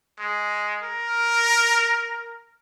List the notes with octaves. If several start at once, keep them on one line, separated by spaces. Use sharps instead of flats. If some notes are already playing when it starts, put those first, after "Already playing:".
G#3
A#4